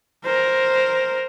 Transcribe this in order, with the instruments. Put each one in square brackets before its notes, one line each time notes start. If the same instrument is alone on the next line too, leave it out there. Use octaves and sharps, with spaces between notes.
[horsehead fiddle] A#4 C5